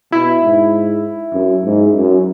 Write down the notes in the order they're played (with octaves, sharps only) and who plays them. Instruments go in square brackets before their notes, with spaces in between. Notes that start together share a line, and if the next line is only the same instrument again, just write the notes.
[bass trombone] B2 [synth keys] E4
[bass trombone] G#2
F#2
G#2
F#2